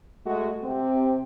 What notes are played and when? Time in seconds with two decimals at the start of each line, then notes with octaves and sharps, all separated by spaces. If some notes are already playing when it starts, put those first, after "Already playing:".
0.25 G#3 A3 F#4
0.63 C3 C4